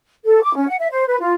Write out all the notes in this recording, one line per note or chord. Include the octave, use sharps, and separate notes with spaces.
A4
D6
C#4
F#5
E5
C5
B4
F4